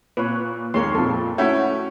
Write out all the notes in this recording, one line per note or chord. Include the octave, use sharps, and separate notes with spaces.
A#2 B4 C#5 F#6
D#2 G#3 A#3 A#4 C#5 C6
F2 A#2 A4
A3 C#4 E4 F#4 E5 G5